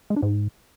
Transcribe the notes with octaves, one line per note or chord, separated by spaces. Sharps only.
G#3
D4
G#2